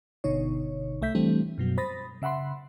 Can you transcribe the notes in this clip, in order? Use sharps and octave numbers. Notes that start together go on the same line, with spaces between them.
G1 B2 D3 D#4 C#5
C2 A3 E5 G6 B6
E3 G3 A3 C4 D4
F#2 B2 F#3
C5 B5 D#6 A6 A#6
C#3 E5 F#5 B5 C6